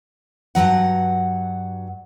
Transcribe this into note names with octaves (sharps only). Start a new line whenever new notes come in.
G2 C#3 F#3 F#5